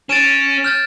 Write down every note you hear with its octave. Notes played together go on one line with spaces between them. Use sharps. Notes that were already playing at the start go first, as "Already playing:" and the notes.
C#4 A6 D7 E7
F6 G6 A6